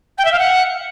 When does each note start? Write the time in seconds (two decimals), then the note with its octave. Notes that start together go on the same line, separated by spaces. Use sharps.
0.18 G5
0.25 E5
0.32 F5
0.39 F#5